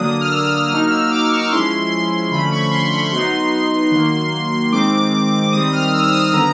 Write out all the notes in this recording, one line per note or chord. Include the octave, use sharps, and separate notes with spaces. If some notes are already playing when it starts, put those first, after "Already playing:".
Already playing: D3 F#3 A#3 D4 D#6
F6
E6
F#3 A#3 D#4 F6
E6
D6
C#6
F3 G#3 C#4 E4 C6
C6
D3 F3 A3 C#4 B5
C#6
C6
B5
F#3 B3 D#4 C6
D#3 F#3 A#3
D#3 G#3 C4 D6
D#3 G3 C4 D#6
F6
E6
D#6
D3 F#3 B3 A#5